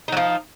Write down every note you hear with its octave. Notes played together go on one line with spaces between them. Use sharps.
F3 F#3 D#4